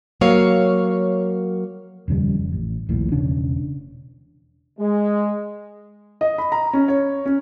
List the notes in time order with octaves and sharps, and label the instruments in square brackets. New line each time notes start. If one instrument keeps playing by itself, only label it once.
[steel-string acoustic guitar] F#3 A#3 C#5 F5
[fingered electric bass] D#1 F2 C#3 G3
A1
D#1 A#1 A2
E1 C#3 C#4 D4
[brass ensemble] G#3
[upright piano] D#5
B5
A#5
C#4
C#5
C#4